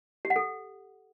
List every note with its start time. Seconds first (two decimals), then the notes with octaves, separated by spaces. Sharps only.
0.25 G4
0.30 F#5
0.36 A4